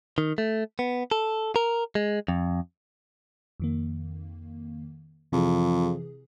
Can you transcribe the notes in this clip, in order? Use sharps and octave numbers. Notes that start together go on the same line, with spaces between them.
D#3
A3
B3
A4
A#4
G#3
F2
F2 D#3 A#3
F2 C3 E3 G#4